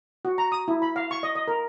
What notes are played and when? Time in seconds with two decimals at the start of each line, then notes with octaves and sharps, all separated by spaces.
0.25 F#4
0.38 A#5
0.52 D#6
0.68 E4
0.82 B5
0.96 F5
1.11 C#6
1.23 D#5
1.35 D#5
1.48 A#4